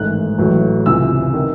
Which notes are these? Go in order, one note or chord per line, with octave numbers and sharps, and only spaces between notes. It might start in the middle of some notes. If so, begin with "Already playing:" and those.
Already playing: A1 G#2 D#3 A3 F#6
A1 A2 F#3 A3
C#2 C3 E3 E6
D#3